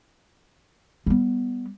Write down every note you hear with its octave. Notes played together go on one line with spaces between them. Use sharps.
G3 B3